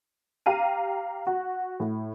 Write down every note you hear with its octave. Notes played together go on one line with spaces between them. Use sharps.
G4 F5 A#5 D#7
F#4
A2